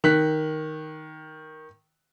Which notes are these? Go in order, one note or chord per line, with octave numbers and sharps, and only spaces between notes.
D#3 F#6 B6